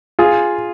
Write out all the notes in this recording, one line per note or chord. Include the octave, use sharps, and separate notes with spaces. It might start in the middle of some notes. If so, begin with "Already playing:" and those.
F4 G#4